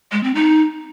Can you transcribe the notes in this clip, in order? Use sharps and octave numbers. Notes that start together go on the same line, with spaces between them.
G#3
C4
D#4